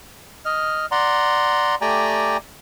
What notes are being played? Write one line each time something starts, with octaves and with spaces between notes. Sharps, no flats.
D#5 F6
D5 F#5 A#5 C6
A3 G4 D5 G5 G#5 A#5